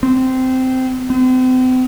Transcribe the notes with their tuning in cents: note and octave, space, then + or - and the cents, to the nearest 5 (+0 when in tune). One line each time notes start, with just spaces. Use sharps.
C4 -15
C4 -40